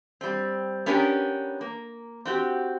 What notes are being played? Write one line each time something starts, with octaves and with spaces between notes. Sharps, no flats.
G3 C4
B3 C#4 D4 G4 A#4 B4
A#3
C4 F#4 G4